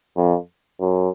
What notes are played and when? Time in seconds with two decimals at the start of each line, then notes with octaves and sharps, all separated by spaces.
0.17 F2
0.80 F#2